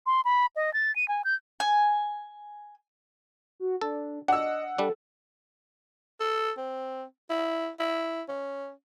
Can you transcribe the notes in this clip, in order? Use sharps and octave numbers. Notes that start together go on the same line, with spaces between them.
C6
B5
D#5
A6
D#7
G#5
G6
G#5
F#4
D4 A4
D4 D#5 F#5 E6
G3 D4 A4
A4
C4
E4
E4
C#4